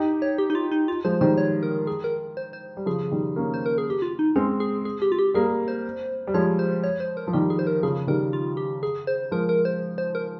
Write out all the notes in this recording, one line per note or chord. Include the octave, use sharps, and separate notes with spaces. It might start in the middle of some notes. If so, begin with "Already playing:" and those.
Already playing: D#4 G4
C#5
G4
D#4
F4
D#4
F4
F3 G#3 C5
D#3 G3 C5
C#5
A#4
G#4
A#4
C5
C5
G3
C#3 F3 G#4
D#3 G3
A#3 C#4
C5
A#4
G#4
G4
F4
D#4
G#3 C4 C#4
G#4
G#4
G4
F4
G4
G3 A#3 G#4
C5
G3
F3 G#3 C#5
C5
C#5
C5
A#4
F3
D#3 G3 G4
G#4
C5
A#4
C#3 F3 G#4
D#3 G3 A#4
F4
G4
G#4
C5
F3 G#3 A#4
A#4
C5
C5
A#4